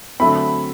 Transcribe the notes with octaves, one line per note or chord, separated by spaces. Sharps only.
D3 F#3 A3 C4 B5